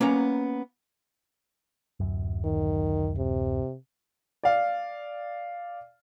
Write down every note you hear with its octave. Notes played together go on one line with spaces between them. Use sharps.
A#3 B3 C#4 A#5
D1 F#2
D#3
C3
D5 F5